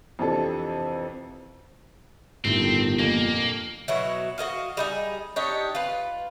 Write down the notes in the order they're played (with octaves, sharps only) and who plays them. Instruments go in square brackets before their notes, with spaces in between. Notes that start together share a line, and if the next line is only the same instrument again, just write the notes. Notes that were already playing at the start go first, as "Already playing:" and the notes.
[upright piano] F2 C3 E3 D4 A4 A5
[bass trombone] G1 [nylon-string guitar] A2 D#3 [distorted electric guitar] C4
[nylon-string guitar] F2 A#2 [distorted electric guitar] A#3
[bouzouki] B2 F#3 E4
F#4 A#4 D#5 F5
G3 D#4 G#4
D4 D#4 G4 C#5
F4 B4